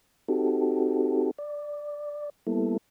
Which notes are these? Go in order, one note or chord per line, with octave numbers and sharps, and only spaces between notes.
C4 D#4 F#4 G4 A4
D5
G3 A#3 B3 E4 A4